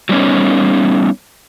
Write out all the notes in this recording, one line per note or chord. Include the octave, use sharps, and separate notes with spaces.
F#3 G3 B3 C#4 D#4